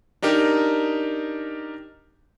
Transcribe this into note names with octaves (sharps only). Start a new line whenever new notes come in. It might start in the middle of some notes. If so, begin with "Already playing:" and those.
D4 D#4 G4 A#4